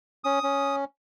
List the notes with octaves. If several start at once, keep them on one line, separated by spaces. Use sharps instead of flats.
C#4 D#6
C#4